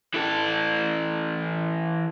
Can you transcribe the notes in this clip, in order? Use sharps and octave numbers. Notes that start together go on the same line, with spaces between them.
E3 A4